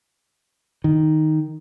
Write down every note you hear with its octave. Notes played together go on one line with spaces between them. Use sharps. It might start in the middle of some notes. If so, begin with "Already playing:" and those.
D#3